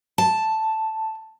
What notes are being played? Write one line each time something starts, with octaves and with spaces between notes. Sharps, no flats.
A5